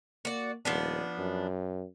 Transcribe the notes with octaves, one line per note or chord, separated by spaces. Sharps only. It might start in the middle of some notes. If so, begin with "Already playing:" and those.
A#3 F#4 D5
D#1 F3 B3 D4
F#2